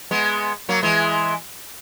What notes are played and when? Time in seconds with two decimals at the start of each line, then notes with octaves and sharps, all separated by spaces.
0.11 G#3 B3
0.69 F#3 A#3
0.83 E3 G#3